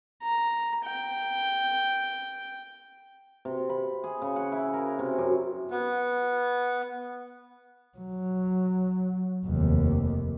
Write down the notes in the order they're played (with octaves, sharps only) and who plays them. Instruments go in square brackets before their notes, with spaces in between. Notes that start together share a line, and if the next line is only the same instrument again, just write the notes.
[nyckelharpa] A#5
G5
[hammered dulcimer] C3
B5
G#4
C#3
F#5
E4
A#4
C3
F#2
[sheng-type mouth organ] B3
[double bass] F#3
F1 D#2